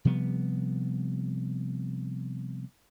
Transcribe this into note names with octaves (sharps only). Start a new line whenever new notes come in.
C3 F3 G3 B3